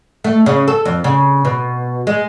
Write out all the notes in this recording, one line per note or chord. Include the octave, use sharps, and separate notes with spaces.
A3
C#3
A4
F2
C#3
B2
G#3